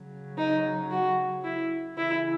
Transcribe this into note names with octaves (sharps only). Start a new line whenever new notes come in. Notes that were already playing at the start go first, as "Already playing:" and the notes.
Already playing: C#3 F#3
D#4
F#4
E4
C#3 E3 E4